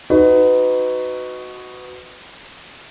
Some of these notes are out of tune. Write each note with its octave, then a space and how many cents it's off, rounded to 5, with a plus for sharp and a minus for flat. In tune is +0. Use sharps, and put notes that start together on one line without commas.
D#4 +0 F#4 +0 B4 +25